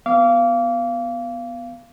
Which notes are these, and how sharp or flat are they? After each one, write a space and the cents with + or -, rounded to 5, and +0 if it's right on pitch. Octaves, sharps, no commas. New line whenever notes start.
B3 +0 F5 -20 D6 -30